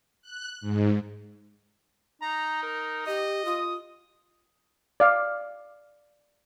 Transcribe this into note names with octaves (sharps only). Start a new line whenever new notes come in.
F#6
G#2
D#4 A#5
A#4
G4 D#5
F4 D#6
D5 F5